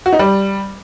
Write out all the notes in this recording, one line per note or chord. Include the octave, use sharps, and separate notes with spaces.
F#4
D#4
G3